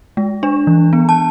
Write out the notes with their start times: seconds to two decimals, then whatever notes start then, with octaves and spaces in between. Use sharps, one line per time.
0.17 G#3
0.43 D4
0.67 E3
0.93 B3
1.09 A5